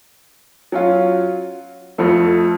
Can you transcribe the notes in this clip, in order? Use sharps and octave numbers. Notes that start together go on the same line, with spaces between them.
F#3 C#4 F4
F2 F3 A3